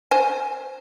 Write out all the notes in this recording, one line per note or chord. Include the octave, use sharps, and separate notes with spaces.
C5 G#5